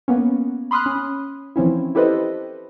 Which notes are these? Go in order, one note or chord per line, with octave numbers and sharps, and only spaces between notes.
A#3 B3 C#4
B5 C6 D#6 F6 F#6
C#4
E3 F3 C4 C#4 E4
E4 G4 A4 B4 C5 D#5